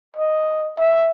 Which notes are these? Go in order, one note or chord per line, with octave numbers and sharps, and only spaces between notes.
D#5
E5